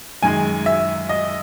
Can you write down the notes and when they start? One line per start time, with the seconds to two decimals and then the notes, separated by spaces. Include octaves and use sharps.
0.22 F#2 D#3 G#3 G#5
0.66 E5
1.09 D#5